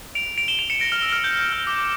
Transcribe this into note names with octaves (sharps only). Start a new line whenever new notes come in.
D7 F7
D7 F7
E7 G7
D7 F7
C#7 E7
A#6 D7
F6
E6
F6
G6
G6
F6
D6
D6